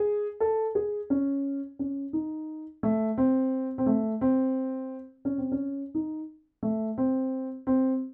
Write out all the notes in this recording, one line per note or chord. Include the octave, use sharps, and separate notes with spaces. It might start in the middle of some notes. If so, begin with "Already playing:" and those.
Already playing: G#4
A4
G#4
C#4
C#4
D#4
A3
C4
C4
A3
C4
C#4
C4
C#4
D#4
A3
C4
C4